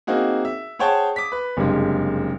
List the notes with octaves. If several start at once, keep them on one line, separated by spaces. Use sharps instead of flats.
A#3 C4 D#4 F#4 G#4
E5
G#4 C5 C#5 F#5 G5 A5
D6 D#6 B6
B4
F#1 G2 C3 G#3